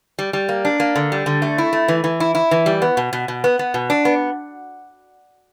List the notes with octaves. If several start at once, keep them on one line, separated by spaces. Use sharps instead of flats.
G3
G3
A#3
D4
A#3
D3
G3
D3
A3
E4
A3
E3
E3
E4
E4
E3
G3
B3
B2
B2
B2
B3
B3
B2
D4
B3